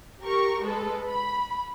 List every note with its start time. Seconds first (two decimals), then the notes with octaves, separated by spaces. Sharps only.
0.21 G4 A#4 C#6
0.65 G#3 A4 B4
1.05 B5